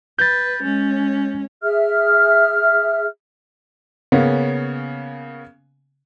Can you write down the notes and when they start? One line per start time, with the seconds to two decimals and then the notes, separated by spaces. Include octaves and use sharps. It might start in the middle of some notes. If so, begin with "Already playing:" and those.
0.19 B4 G6 A6
0.61 G#3 C#4
1.63 G#4 E5 F6
4.12 C#3 A#3 B3 C#4